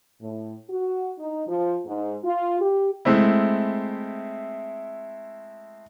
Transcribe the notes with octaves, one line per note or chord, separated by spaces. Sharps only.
A2
F#4
D#4
F3
G#2
F4
G4
G#3 A3 C4 E4